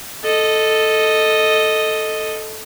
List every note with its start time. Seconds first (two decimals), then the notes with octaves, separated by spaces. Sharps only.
0.24 A4 D#5